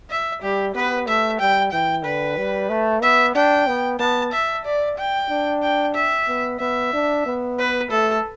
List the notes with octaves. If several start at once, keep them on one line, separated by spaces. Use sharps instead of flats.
E5
G3 G4
B3 B4
A3 E5
G3 G5
E3 G5
D3 B4
G3
A3
B3 E5
D4 G5
B3
B3 A5
E5
D5
G5
D4
G5
E5
B3
B3 E5
D4
B3
B4
A3 A4